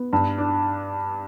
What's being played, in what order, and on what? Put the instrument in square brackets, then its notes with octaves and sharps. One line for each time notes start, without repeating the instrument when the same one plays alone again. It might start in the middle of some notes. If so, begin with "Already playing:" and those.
Already playing: [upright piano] B3
G2
D4